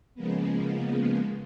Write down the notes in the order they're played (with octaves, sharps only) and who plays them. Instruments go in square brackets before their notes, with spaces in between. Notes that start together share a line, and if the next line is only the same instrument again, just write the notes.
[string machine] C#3 F3 G#3 A#3 B3